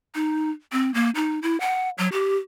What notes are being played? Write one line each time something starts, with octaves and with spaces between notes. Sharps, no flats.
D#4
C4
A#3
D#4
E4
F#5
F#3
G4